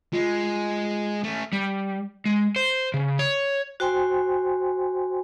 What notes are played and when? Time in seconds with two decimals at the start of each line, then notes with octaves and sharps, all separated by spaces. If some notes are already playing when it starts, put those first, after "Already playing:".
0.13 G#3 F4
1.24 A3 C#4
1.53 G3
2.26 G#3
2.56 C5
2.94 C#3
3.19 C#5
3.80 F#4 C5 G5 G#5 C6